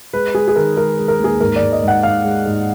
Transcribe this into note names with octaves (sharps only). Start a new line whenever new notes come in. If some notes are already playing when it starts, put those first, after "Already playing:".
G#3 B4
G#3 G#4
G#4
D#3 A#4
G#3 A#4
G#3
A#4
D#2
G#4
G#2 A#4
D5
G#2
D#5
G#2 F#5
G#2 F5
G#3
G#2